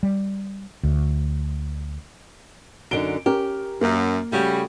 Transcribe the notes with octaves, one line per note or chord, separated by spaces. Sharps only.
G3
D2
F#2 D3 D#4 D7 G7
C#4 G4 A#4
F#2 A#3
C#3 G3 A3 F#4